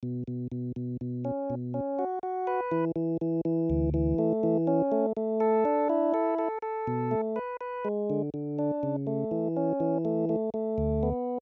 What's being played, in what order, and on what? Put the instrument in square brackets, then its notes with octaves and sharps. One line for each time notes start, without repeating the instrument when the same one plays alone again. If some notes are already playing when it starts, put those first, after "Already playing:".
[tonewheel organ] B2
B2
B2
B2
B2
C#4
B2
C#4
F#4
F#4
B4
E3
E3
E3
E3
D2
E3
A3
E3
C#4
A3
A3
A4
D4
E4
A4
A4
A4
B2
A3
B4
B4
G#3
D3
D3
D4
C#3
A3
E3
C#4
E3
A3
A3
A3
D2
B3